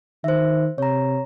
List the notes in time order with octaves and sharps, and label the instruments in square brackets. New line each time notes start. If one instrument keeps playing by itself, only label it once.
[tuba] D#3 [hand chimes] C5 E5
[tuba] C3 [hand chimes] C#5 A#5